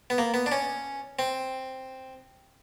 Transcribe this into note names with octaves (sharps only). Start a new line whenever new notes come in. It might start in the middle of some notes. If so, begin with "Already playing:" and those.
B3
A#3
B3
D4
C#4
C4